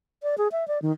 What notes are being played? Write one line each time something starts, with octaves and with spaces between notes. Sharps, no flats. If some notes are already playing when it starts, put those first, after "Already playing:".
D5
G#4
E5
D5
D#3